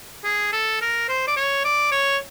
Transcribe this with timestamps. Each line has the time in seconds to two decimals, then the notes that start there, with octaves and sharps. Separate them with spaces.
0.24 G#4
0.53 A4
0.81 A#4
1.09 C5
1.28 D5
1.37 C#5
1.65 D5
1.92 C#5